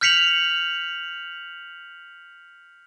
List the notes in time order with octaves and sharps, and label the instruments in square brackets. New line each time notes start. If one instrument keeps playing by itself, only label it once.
[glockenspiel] F6 G6 B6 C#7 F7 F#7